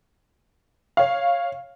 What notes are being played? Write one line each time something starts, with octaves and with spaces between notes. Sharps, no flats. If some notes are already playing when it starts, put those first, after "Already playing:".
C#5 F5